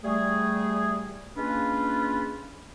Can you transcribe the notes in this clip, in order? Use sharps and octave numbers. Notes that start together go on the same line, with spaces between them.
G3 A3 G#4
G#3 A#3 C#4 D4 F4 B4